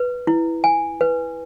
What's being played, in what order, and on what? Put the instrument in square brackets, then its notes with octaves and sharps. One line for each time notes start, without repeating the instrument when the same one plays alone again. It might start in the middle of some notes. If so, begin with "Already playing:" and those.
Already playing: [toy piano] B4
E4
G#5
B4